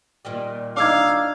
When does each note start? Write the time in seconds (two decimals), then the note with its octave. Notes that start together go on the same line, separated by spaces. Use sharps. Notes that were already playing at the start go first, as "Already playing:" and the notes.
0.25 A#2 D#3 G3
0.77 D4 D#4 F5 D6 E6 G#6